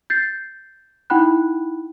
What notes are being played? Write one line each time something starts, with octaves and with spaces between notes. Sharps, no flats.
G6 A6 C7
D#4 E4 F#5 G5 B5 F#6